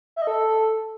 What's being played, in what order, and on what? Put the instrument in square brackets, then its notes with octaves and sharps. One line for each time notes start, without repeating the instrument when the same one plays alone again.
[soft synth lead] E5
D#5
A4